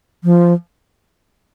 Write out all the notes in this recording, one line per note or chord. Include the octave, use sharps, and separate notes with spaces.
F3